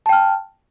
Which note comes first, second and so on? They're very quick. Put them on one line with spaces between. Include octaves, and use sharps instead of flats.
A5 G5 F6